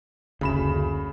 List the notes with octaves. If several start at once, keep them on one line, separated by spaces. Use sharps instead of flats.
F#1 D2 C#3 B5 E7